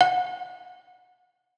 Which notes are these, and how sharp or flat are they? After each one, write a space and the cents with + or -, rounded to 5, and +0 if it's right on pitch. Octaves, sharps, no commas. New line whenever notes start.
F#5 -25